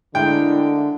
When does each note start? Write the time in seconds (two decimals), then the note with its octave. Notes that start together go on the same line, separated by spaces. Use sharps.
0.15 D3 G#3 A3 E4 A#4 G5